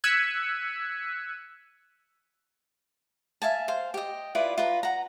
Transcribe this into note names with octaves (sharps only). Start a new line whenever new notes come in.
E6 F#6 G#6 B6 C#7 D#7
E5 F5 G#5 A5
C5 F5
G4 D#5
E4 F4 B4 D5
F4 B4 A#5
F#5 A#5